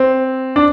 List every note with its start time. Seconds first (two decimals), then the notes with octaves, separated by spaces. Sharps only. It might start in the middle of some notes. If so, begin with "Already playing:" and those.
Already playing: C4
0.56 D4